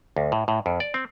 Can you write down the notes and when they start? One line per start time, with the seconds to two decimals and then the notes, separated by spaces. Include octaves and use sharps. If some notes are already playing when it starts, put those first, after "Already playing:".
0.16 D2
0.32 A2
0.48 A2
0.66 F2
0.80 D5
0.94 C4